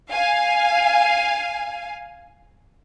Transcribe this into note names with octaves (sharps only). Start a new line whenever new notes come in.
F5 G#5